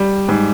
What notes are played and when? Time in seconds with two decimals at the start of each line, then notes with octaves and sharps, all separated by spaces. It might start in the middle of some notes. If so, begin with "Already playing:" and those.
Already playing: G3
0.29 G#2